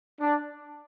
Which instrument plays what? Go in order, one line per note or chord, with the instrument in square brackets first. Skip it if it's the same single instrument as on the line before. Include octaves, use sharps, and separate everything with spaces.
[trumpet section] D4